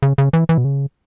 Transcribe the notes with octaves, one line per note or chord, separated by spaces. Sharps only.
C#3
C#3
E3
E3
B2
C#3